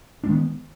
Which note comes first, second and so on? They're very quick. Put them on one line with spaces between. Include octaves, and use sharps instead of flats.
D4 G#3 D#3 B3